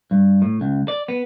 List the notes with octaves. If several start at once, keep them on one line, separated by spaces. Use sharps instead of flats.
G2
A2
C#2
D5
B3